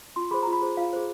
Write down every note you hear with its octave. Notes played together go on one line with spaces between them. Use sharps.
F4 C6
G#4 C5 B5
F4 A#5
B5
G#4 C5
F4 F5
G#4 C5